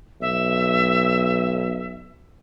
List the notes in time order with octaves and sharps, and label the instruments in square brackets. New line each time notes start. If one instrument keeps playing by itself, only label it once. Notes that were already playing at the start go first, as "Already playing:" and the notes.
[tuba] B1 [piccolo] E5